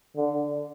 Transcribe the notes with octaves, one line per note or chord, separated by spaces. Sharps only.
D3